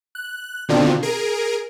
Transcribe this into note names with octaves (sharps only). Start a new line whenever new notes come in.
F#6
B2 D3 D#3 C4 D4 F4
G#4 A#4 D7